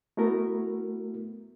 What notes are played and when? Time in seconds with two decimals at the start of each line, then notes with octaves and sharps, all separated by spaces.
0.17 A3 B3 E4 F#4 A#4